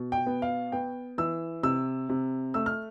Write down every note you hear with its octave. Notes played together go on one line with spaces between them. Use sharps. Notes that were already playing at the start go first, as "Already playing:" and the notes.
Already playing: B2
G5
B3
F5
B3 G5
E3 E6
C3 E6
C3
A3 E6
F6